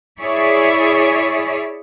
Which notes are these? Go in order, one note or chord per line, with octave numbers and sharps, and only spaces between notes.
E4 G#4 C#5 D5 E5